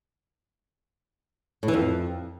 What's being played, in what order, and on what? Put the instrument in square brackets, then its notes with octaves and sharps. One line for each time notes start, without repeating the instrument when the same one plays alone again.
[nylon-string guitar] A2
E3
F2